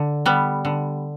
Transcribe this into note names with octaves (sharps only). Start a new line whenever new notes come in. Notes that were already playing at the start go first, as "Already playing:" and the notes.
Already playing: D3
G3 B3
D3